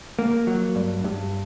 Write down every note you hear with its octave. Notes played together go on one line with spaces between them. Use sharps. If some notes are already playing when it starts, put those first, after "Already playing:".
A#3
F#3
G2
G2